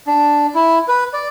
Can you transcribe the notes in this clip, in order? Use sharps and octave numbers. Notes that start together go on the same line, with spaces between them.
D4
E4
B4
D5